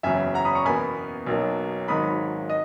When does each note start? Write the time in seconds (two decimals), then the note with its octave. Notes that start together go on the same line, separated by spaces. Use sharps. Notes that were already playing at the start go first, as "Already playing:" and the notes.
0.03 F#1 E2 C#3 F#3 E5 G#5
0.34 F#5 A#5
0.45 B5 D#6
0.55 A#5 C#6
0.65 E2 B2 A#3 G#5 B5
1.26 B1 B2 F#3 A#3
1.88 G#1 G#2 D#3 F#3 B5 D#6
2.50 D#5